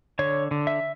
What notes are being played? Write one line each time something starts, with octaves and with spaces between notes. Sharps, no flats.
D3 C#5
D3
E5